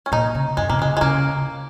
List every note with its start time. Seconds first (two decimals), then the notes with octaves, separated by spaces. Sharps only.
0.06 C#4
0.12 A#2 D#4
0.35 C#3
0.57 F#2 G#3
0.69 B2 A#3
0.79 C#3 G#3
0.97 G#3
1.01 C#3 A#3